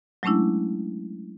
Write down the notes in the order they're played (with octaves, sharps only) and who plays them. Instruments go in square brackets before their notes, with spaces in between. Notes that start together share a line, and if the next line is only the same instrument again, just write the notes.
[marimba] F#3 G#3 A3 C#4 D4 E4